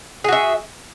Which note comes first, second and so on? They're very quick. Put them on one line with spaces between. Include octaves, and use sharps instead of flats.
G#4 F#4 E5